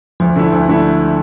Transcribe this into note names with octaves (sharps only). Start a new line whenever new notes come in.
D2 F3
D3 A3 E4
D2
D3 A3 E4